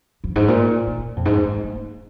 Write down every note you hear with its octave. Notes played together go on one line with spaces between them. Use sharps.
F2
G#2
A#2
A#2
F2
G#2
G#3
A#3